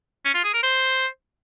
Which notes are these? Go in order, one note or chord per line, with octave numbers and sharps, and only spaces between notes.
C#4
F4
G#4
A#4
C5